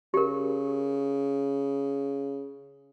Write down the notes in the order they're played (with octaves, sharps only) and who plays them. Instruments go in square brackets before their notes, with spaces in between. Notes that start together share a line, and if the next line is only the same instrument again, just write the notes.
[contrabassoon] C#3 [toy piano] G4 A#4